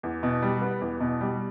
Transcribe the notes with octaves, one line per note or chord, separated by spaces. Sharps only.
E2
B2
G3
B3
E2
B2
G3